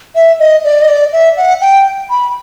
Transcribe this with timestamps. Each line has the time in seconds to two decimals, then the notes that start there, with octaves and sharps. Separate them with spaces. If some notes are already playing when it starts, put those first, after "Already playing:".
0.15 E5
0.40 D#5
0.64 D5
0.82 D#5
0.88 D5
1.13 E5
1.37 F#5
1.61 G5
2.10 B5